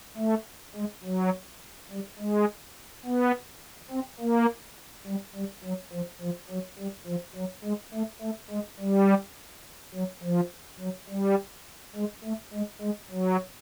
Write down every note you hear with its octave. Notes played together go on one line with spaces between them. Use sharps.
A3
G#3
F#3
G3
G#3
B3
C4
A#3
G3
G3
F#3
F3
F3
F#3
G3
F3
F#3
G#3
A3
A3
G#3
G3
F#3
F3
F#3
G3
G#3
A3
G#3
G#3
F#3